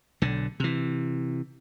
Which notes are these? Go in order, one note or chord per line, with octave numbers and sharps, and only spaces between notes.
B1 D3
C3 E3